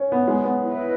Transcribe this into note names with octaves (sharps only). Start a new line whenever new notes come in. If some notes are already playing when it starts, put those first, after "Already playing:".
Already playing: C#4
B3
G#3
B3
E4 B4 D#5